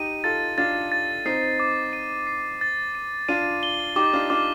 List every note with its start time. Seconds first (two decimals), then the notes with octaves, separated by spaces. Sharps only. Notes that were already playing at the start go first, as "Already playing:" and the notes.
Already playing: D#4 G4 D#7
0.24 F4 A4 A6
0.58 D4 F4 A6
0.92 A6
1.26 C4 D#4 C7
1.60 D6
1.93 D#7
2.27 C7
2.61 A6
2.95 D#7
3.28 D4 F4 D#7
3.63 G7
3.96 D#4 G4 D6
4.13 D4 F4
4.30 D4 F4 D6